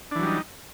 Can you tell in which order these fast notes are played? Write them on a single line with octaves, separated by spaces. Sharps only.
D4 E3 F#3 G3 D#4